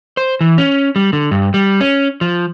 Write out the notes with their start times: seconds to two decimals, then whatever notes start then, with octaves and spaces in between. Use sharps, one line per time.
0.17 C5
0.41 E3
0.58 C#4
0.96 G3
1.13 D3
1.31 G2
1.54 G3
1.80 C#4
2.21 F3